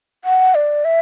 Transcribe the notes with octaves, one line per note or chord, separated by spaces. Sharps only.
F#5
D5
E5